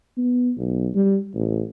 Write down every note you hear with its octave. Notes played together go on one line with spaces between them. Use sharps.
B3
B1
G3
A1